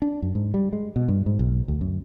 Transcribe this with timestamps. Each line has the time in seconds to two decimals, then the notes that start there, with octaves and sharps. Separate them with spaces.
0.02 D4
0.22 F#2
0.35 G#2
0.54 G3
0.73 G#3
0.96 B2
1.08 G2
1.26 G#2
1.39 B1
1.68 D2
1.81 F#2